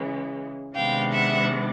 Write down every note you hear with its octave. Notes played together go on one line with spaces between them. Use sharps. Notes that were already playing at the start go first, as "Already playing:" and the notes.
Already playing: C#3 E3 G#3
C3 D#3 G#3 B3 D4 F5 G5
E5 F#5